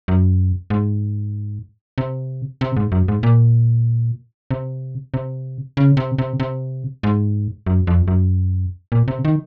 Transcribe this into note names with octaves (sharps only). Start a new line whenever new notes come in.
F#2
G#2
C3
C3
G#2
F#2
G#2
A#2
C3
C3
C#3
C3
C3
C3
G#2
F#2
F2
F#2
A#2
C3
D#3